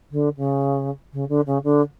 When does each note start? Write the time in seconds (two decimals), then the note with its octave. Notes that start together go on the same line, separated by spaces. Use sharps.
0.11 D3
0.37 C#3
1.13 C#3
1.29 D3
1.46 C#3
1.64 D3